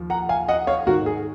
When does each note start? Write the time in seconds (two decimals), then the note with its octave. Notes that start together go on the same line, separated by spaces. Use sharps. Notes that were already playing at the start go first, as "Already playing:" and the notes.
Already playing: D#2 F3
0.10 F#5 A#5
0.29 F5 G#5
0.49 D#5 F#5
0.67 C#5 F5
0.87 G#2 D#3 F#4 A#4
1.06 G#4